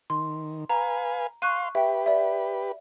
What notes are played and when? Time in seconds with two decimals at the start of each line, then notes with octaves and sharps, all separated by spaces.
0.10 D#3 C6
0.70 B4 F5 G#5 A#5
1.42 F5 C6 C#6 F#6 D#7
1.75 G4 B4 E5 G5
2.06 D5 E5